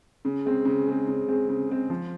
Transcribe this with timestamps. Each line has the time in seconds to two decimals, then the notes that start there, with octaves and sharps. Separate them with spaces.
0.25 C#3
0.45 G#3 C4
0.65 C#3
0.87 G#3 C4
1.08 C#3
1.28 G#3 C4
1.48 C#3
1.69 G#3 C4
1.90 F3